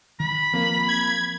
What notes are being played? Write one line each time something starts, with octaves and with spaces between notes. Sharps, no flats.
D#3 B5
F3 A#3 C4
G#6